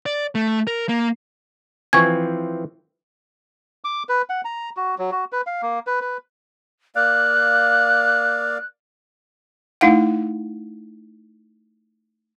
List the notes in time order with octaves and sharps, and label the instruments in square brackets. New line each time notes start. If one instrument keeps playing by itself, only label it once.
[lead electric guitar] D5
A3
A#4
A#3
[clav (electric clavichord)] E3 F3 C4 [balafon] G#5 C#6 [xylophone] G#6
[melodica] D6
B4
F#5
A#5
F#4
F#3
F#4
B4
F5
A#3
B4
B4
[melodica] A#3 D5 F5 [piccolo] F#6
[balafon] A3 D#4 E4 F5 F#5